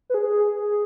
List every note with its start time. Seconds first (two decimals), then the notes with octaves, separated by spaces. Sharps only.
0.10 B4
0.14 G#4